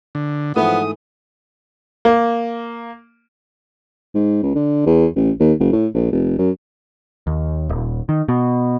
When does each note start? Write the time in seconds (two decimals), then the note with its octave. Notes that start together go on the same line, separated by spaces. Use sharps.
0.15 D3
0.56 G#2 E3 F3 A3 B3 D#6
2.05 A#3
4.15 G#2
4.43 C#2
4.55 D3
4.86 E2
5.16 A1
5.40 D#2
5.60 F#1
5.73 A2
5.94 A#1
6.12 F1
6.38 F#2
7.27 D#2
7.69 D#1
8.09 D#3
8.28 B2